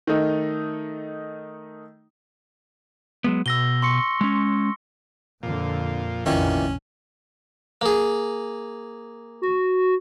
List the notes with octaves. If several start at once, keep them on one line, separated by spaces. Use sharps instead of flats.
D#3 A3 D#4
F#3 G#3 B3
B2 E6 A#6 G7
C6 C#6 C#7
G#3 C#4
F2 A#2 D3 F3
F1 A#1 F2 A#2 D#3 E3 C#4
A#3 G#4
F#4